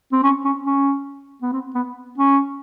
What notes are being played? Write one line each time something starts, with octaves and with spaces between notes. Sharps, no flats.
C4
C#4
C#4
C#4
B3
C4
B3
C#4